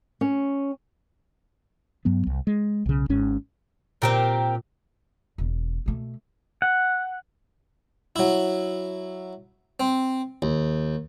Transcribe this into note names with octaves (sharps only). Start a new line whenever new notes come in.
C#4
G2 F#3 B3
C2
G#3
B1 C#3
G#1 G#2 C#4
A#2 C4 G4 A#4
E1
B2 A3
F#5
F#3 E4
C4
D#2